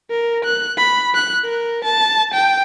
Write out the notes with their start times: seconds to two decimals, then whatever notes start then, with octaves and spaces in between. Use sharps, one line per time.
0.10 A#4
0.45 F#6
0.78 B5
1.15 F#6
1.45 A#4
1.84 A5
2.34 G5